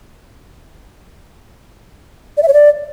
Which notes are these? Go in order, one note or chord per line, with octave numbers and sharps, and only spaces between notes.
D5
E5
C#5
D5